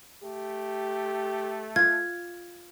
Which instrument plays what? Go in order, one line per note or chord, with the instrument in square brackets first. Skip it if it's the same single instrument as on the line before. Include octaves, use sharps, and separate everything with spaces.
[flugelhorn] A3 [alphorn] G4
[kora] F4 [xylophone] G#6